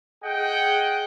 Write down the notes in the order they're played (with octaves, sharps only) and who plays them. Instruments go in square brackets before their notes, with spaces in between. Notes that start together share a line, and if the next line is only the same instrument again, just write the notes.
[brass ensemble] G#4 D#5 F#5 G5